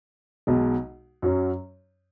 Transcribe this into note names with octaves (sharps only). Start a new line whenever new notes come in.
B1 B2 G#3
F#2 F#3 C#4